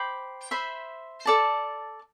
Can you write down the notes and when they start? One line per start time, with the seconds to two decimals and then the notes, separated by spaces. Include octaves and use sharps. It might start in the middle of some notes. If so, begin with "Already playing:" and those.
Already playing: C5 G5 B5 D6
0.51 C5 E5 B5
1.25 A4 D5 A5